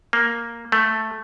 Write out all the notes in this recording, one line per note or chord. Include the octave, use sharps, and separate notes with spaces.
A#3
A3